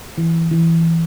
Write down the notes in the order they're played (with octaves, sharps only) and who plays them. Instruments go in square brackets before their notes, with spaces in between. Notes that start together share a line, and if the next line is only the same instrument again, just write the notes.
[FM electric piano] E3
E3